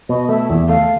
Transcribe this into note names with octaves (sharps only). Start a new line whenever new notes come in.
B2 D#5
A3 E5
E2
A3 F5